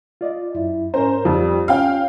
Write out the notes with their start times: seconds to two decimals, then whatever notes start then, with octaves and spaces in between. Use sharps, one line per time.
0.21 F4 D5 D#5
0.55 F#2 E4
0.94 G#2 C#4 A#4 C5 A#5
1.25 F2 G3 F4
1.68 C#4 F5 G5